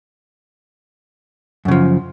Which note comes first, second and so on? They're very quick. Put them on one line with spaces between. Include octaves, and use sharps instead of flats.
F#2 C#3 F3